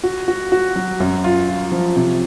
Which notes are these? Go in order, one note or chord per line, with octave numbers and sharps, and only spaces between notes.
F#4
F#4
F#4
F#3
F#2
F4
F4
F3
C3